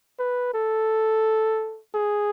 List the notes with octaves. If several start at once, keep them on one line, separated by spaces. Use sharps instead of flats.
B4
A4
G#4